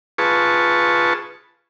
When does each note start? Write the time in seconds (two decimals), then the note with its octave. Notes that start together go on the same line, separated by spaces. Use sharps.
0.18 F4 G#4 B4 A5 C#6